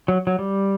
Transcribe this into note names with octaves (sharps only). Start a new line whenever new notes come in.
F#3
F#3
G3